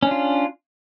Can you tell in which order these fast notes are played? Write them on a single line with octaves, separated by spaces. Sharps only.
C#4 D4 F4